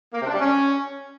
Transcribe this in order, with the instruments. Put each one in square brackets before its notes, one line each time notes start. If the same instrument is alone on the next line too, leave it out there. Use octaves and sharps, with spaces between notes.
[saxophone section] A#3
C3
D4
G3
C#4